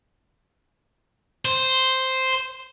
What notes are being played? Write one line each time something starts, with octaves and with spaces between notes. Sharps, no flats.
C5